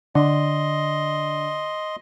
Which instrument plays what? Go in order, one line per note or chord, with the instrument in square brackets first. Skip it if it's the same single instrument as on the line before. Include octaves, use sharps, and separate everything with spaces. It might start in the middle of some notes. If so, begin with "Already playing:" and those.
[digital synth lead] D3 [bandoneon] D#5 C6